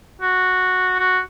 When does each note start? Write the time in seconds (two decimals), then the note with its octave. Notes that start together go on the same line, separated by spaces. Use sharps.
0.22 F#4
0.99 F#4